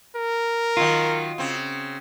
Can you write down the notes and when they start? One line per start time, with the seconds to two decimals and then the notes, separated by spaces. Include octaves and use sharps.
0.16 A#4
0.77 D#3 F#3 F4
1.38 C#3 C4